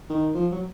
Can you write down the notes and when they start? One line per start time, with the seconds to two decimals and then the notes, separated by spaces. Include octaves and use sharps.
0.10 D#3
0.35 F3
0.52 F#3